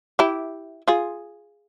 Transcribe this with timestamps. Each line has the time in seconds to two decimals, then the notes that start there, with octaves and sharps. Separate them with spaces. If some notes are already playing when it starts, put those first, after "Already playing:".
0.19 E4 G4
0.88 F4 G#4